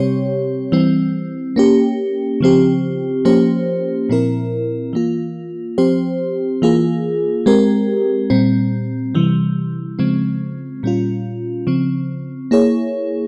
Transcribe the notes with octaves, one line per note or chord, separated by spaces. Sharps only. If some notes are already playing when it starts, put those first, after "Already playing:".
Already playing: C3 G3 C4 G4 C#5
E3 G3 C4
A#3 C#4 G4
C#3 F3 C4 G4
F3 A#3 C#4 G4 C5
A#2 F3 C4 E4 A#4
E3 A#3 F4
F3 C4 G4 C5
E3 A#3 F4 G#4
G#3 C4 G4 A#4
A#2 G3 C4
C3 E3 G3
C#3 F3 G#3 C4
A#2 G3 C#4 F4
C#3 F3 C4
A#3 E4 G#4 C#5